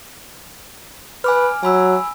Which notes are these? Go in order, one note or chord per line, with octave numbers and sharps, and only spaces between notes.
B4 G#5 D6 F6
F#3 G#5 B5 E6